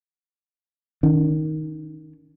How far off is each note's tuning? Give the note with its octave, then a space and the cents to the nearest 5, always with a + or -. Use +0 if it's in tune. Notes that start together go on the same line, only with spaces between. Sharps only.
D#3 +0 C#4 +45